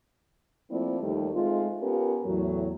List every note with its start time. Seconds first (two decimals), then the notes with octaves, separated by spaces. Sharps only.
0.70 F3 A3 A#3 C4 E4 D5
1.01 D#2 D#3 F3 G3 A3
1.32 G#3 A3 C4 D#4 F4
1.80 B3 C#4 F4 G4 A4 A#4
2.25 E2 A2 F#3